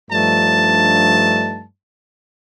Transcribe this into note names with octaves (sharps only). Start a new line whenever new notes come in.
G2 F3 A3 D4 D#4 A5